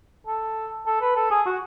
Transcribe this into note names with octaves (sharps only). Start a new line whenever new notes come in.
A4
A4
B4
A4
G#4
F#4